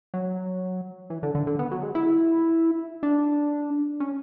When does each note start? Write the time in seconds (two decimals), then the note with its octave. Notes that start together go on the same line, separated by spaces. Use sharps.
0.14 F#3
1.10 E3
1.23 D3
1.35 D3
1.47 D3
1.59 B3
1.71 F#3
1.83 G#3
1.95 E4
3.03 D4
4.00 C#4